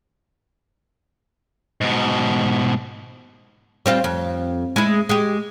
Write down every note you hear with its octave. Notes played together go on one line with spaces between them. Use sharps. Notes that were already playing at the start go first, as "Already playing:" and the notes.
G#2 B2
G3 C4 F4
F2
G#3 E4
G#3 G4